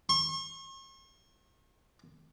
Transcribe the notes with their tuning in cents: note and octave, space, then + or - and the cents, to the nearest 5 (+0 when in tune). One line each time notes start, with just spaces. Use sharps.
C#6 -45